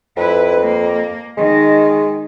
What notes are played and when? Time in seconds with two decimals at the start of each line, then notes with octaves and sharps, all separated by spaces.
0.17 F2 E4 B4
0.61 A#3
1.37 D#3 G#3